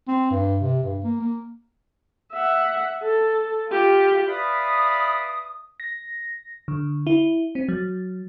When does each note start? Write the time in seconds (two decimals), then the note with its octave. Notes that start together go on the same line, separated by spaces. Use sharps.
0.08 C4
0.31 G2
0.60 C3
0.83 G2
1.04 A#3
1.21 A#3
2.33 E5 F#5
3.02 A4
3.69 F4 G4
4.27 B4 D5 E5 F5 B5 D#6
5.80 A#6
6.68 D3
7.07 E4
7.55 C4
7.69 F#3